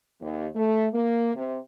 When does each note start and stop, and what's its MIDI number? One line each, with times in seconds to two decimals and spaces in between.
0.20 0.47 39
0.55 0.87 57
0.93 1.31 58
1.35 1.57 48